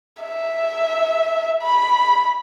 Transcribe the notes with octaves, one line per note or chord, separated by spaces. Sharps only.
E5
B5